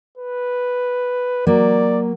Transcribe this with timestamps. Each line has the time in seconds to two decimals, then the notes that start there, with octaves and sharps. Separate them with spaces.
0.18 B4
1.47 F#3 A#3 D5